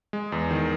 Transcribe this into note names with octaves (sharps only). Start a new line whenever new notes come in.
G#3
E2
D#3